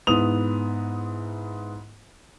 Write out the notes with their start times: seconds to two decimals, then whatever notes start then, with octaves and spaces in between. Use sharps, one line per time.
0.07 G#2 B3 E4 D#6 F7